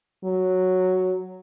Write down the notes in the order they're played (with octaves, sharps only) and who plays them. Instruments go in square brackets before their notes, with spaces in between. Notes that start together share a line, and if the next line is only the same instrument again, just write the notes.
[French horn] F#3